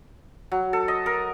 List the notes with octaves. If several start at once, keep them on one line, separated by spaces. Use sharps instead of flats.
F#3
A4
D#5
A#4